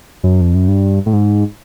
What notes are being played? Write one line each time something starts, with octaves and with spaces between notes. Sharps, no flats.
F#2
F2
F#2
G2
A2
G#2